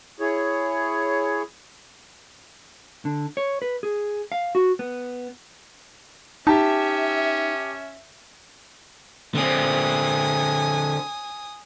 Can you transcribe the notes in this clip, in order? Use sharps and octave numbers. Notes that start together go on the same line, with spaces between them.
E4 G#4 C#5
D3
C#5
B4
G#4
F5
F#4
B3
C#4 D#4 G4 E5 A5
D3 C4 G#5 D#6